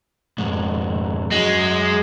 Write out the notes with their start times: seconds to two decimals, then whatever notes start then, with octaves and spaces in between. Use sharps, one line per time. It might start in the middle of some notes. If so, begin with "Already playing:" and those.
0.38 F2 G#2
1.32 F#2 G#3 F#4